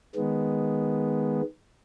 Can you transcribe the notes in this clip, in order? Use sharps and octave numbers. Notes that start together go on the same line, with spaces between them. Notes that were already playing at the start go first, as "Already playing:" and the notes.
D#3 G#3 B3